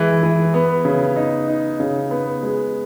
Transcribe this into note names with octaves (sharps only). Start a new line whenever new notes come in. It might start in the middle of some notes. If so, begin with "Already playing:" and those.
Already playing: E3 G#3
E3
B3
C#3
D#4
D#4
C#3
B3
G#3